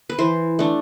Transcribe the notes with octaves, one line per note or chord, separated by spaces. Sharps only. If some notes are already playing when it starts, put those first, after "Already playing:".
B4
E3 C5
A3 D4